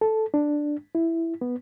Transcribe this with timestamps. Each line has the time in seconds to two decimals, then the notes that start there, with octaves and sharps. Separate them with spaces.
0.01 A4
0.34 D4
0.95 E4
1.41 B3